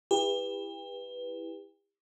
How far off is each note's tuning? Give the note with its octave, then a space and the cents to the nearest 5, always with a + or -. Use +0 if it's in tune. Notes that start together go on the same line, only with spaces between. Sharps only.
E4 +0 G4 +35 B4 +0